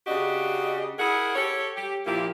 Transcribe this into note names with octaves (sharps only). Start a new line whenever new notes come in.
C#3 D4 F#4 G4 D#5
E4 G#4 A#4 F#5
G4 A4 C#5
G4
A#2 F3 A#3 E4 G4